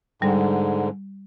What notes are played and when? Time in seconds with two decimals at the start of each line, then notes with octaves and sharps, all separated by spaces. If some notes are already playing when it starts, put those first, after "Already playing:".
0.22 G#2 D3 G3